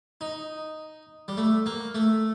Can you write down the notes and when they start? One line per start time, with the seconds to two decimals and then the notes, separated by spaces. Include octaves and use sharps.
0.21 D#4
1.28 G3
1.37 A3
1.66 A#3
1.95 A3